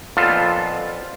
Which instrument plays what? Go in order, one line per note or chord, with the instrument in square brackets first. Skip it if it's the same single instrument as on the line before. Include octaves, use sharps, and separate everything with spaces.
[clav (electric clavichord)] F2 A#2 F3 B3 F4 A4